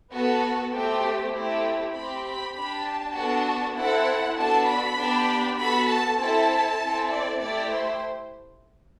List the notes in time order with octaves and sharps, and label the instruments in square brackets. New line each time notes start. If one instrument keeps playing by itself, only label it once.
[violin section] B3 F#4 A4
A3 C4 G4
A3 C4 E4 G4
C4 G4 B5
B5
D4 G4 B5
A5
B3 D4 F#4 A4
C4 E4 A4 F#5
B3 D4 F#4 A4 A5
B5
B3 D4 G4
B3 F#4 A4 B5
A5
C4 E4 A4 A5
C4 E4 A4
D5
A3 E4 G4 D5
C5